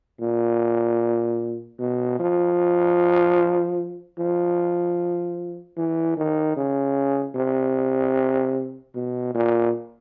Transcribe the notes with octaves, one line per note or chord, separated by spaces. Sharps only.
A#2
B2
F3
F3
E3
D#3
C#3
C3
B2
A#2